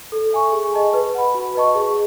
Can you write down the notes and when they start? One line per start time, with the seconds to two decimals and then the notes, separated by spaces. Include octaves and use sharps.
0.12 A4
0.32 E5 G#5 C#6
0.52 G#4
0.72 D#5 A5 C#6
0.94 B4
1.15 F#5 B5
1.35 F#4
1.55 B4 D#5 A5 C#6
1.75 G#4